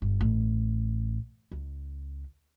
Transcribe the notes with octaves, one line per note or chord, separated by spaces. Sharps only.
G1
A1
C#2